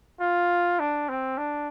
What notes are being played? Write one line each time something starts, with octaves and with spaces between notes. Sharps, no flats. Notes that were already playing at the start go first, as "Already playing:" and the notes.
F4
D4
C4
D4